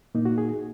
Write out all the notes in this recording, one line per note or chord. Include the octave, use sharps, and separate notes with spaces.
A#2 A#3 D#4
F#4
G#4